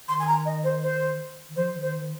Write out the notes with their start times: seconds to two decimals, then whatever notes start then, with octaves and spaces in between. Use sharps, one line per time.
0.08 D#3 C6
0.20 G#5
0.27 A#5
0.45 D#5
0.64 C5
0.82 C5
1.49 D#3
1.56 F3 C5
1.75 D#3
1.81 C5
1.94 D#3